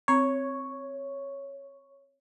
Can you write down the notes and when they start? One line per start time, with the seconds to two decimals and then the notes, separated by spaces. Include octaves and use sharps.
0.08 C4 C#5 A#5